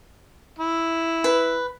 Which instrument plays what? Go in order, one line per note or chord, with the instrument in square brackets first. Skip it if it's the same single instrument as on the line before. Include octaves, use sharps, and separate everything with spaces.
[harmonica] E4
[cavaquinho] B4